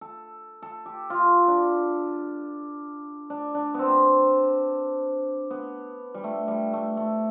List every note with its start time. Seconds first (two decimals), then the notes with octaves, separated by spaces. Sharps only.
0.01 A4
0.62 A4
0.86 G4
1.10 F4
1.48 D4
3.30 D4
3.55 D4
3.74 B3 C4
5.51 B3
6.15 G3
6.24 A3
6.48 G3
6.73 A3
6.97 A3